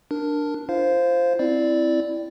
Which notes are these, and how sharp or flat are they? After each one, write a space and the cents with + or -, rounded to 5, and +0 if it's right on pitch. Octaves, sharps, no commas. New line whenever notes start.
D4 +5 A#4 +0
F4 -35 C5 +0 F5 +0
C4 +0 E4 +5 D5 +0